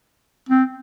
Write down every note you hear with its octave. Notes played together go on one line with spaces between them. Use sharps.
C4